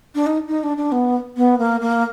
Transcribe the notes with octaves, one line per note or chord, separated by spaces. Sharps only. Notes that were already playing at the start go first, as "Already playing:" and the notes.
D4
D#4
D#4
D4
D4
B3
B3
A#3
A#3